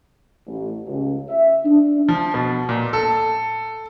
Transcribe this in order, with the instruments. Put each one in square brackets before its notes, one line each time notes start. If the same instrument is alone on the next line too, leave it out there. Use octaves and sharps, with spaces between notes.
[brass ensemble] A1
C#2
E5
D4
[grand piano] F3
B2
A#2
A4